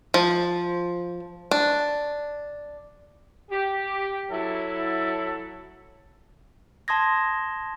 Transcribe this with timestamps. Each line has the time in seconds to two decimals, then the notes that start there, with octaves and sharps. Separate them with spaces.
0.14 F3
1.51 D4
3.51 G4
4.30 F#3 E4 A4
6.88 A5 C6 D#6 G#6 A#6